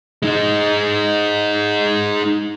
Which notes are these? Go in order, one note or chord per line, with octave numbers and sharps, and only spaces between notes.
G#3 D#4